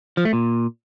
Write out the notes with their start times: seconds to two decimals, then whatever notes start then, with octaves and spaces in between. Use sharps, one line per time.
0.17 F3
0.25 A3
0.33 A#2